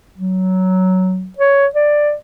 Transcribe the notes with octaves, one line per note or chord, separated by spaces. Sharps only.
F#3
C#5
D5